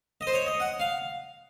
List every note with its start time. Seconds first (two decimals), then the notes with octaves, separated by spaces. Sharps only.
0.21 D#5
0.27 C5
0.33 C#5
0.46 D#5
0.60 F#5
0.80 F5